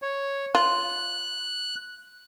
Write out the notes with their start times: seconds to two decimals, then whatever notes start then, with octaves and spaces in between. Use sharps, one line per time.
0.02 C#5
0.55 F4 F#6